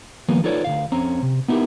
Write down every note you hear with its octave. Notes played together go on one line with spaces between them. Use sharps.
D#3 F3 G3 A#3 B3
D#4 F4 A4 B4 C#5 D5
D2 G#2 F5
F2 C4 C#4 A#5
C3
B3 D#4 E4 F#4 G4 A#4